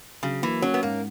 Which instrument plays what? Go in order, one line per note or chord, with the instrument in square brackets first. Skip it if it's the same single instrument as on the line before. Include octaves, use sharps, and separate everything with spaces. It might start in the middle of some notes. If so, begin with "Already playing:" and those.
[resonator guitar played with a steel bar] C#3 [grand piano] F#3
[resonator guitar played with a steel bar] E3 [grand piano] A#3
[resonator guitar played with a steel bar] F#3 [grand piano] C#4
[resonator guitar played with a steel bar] B3
[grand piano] G#2 [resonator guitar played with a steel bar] A#3